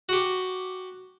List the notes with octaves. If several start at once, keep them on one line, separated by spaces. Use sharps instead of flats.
F#4 G4